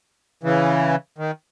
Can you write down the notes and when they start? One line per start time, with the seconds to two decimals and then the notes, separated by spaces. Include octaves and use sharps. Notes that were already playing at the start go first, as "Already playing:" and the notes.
0.43 C#3 E3
1.18 D#3